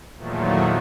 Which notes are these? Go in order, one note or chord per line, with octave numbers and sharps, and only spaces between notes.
E2 A#2 D#3 F3 F#3 A3